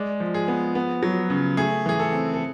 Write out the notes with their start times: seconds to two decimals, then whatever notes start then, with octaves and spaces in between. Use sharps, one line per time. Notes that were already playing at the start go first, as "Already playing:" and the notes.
Already playing: G#3 D5
0.20 F3
0.34 G#4
0.48 B3
0.75 B3
1.03 F#3
1.30 C#3
1.57 A3 G#4
1.86 E3 G#4
1.99 A4
2.13 C4
2.34 A4